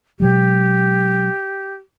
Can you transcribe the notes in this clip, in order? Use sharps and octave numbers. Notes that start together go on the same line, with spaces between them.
B2 F#3 G#3 G4